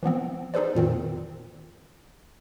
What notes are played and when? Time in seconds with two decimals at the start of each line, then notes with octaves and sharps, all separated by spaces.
0.03 E3 F3 B3 C4
0.54 D#4 G#4 A4 B4 C5 D5
0.75 F2 A#2 D#3 C4